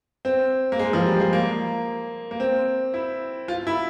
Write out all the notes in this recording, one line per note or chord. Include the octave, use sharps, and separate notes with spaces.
C4
A#3
G#3
F3
G3
G#3
A#3
A#3
C4
E4
F4
E4